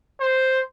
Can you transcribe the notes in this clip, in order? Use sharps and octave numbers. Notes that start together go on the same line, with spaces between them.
C5